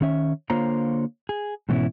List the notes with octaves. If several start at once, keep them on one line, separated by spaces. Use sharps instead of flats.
D#3 C#4 E5
D3 A#3 F4 C5 C#5 A#5
G#4
G#2 B2 E3 B3 C#4 E4